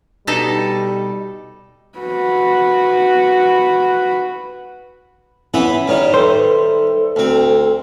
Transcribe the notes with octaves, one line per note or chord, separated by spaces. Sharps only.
B2 G3 D#4 A4
F#4 B4
E3 B3 C#4 E4 B4
D#3 G3 G#4 C#5
D#4 A4 B4 C5 E5
D2 C4